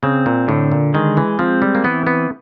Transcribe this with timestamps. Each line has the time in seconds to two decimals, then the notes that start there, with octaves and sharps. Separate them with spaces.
0.03 C#3 C4
0.26 A#2
0.48 A2 D3
0.71 A#2
0.94 D#3 G#3
1.17 E3
1.39 F3 C4
1.62 G3
1.75 A#3
1.84 E3 B3
2.07 B3